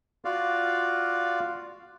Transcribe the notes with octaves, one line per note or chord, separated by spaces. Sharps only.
F4 F#4 D5 F5